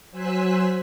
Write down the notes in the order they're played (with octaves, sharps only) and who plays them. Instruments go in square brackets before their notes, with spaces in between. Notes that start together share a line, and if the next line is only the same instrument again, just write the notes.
[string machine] F#3 C5 G#5 E6 F#6 B6